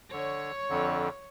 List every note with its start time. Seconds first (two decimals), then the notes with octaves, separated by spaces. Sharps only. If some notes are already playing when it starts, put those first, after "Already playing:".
0.13 D3 C#5
0.70 F2 D3